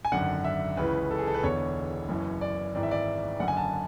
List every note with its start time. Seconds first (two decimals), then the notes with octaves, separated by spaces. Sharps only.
0.05 G#5
0.12 G#1 F#2 D3 F#5
0.45 E5
0.77 C#2 C#3 E3 B4
1.11 A4
1.18 G#4
1.27 A4
1.34 B4
1.43 E1 E2 D3 C#5
2.08 F#1 F#2 E3
2.41 D5
2.75 G#1 G#2 E3 D5
2.83 E5
2.91 D5
3.39 F#1 F#2 D3 F#5
3.48 G#5
3.57 A5